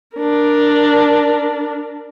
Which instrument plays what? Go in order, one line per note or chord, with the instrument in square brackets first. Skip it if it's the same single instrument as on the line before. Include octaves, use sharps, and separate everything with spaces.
[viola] D4 A#4